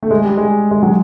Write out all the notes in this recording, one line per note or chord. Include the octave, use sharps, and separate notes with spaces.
A3
G#3
G3
G#3
G#3
F#3